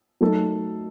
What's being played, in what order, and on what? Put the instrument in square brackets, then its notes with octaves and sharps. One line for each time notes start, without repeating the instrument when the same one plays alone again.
[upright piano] F#3 A3 D#4 A4